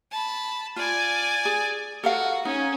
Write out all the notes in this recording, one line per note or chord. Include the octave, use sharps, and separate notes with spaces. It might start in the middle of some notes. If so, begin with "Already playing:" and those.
A5 B5
F4 D5 G#5
G#4
F#4 A4 A#4 F5
C#4 D#4